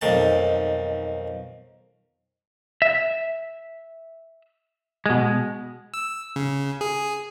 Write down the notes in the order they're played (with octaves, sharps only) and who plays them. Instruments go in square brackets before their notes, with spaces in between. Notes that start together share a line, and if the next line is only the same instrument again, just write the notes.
[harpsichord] B1 F2 D#3 A5
[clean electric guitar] E5
B2 G#3
[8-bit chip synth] E6
C#3
G#4